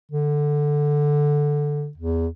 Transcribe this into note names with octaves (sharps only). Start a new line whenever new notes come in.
D3
E2